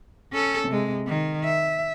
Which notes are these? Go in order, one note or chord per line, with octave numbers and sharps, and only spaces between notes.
C#4 A4
C3 G#3
D#3
E5